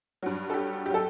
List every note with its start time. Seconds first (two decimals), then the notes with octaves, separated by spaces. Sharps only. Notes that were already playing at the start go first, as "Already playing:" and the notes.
0.23 G2 F#3
0.50 A4
0.54 G4
0.86 G4
0.90 F#3 A4